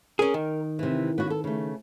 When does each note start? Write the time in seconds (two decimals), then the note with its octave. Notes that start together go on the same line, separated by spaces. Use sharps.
0.19 C#4 G#4 A#4
0.34 D#3
0.79 C3 E3
1.18 B3 C#4 F#4
1.30 A4
1.44 C#3 A3